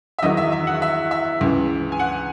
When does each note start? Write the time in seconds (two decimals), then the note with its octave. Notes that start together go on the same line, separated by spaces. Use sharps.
0.19 E5
0.22 E2 D#3 F#3 D#5
0.37 E5
0.52 E5
0.67 F#5
0.82 E5
1.11 E5
1.41 C#2 C#3 E3
1.92 G#5
2.00 F#5